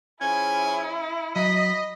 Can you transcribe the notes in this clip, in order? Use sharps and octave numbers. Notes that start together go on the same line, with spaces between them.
F3 C#4 E4 G#4 G#5
F#3 D#5 B5